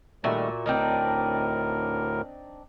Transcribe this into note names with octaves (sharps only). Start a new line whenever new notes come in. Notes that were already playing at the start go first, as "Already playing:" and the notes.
A#2 D#3 G3 A3 F#4 E5
D2 A2 C4 D4 D#4 A#4